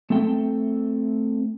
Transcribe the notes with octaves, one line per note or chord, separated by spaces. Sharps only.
A3 C4 A4 E5 G5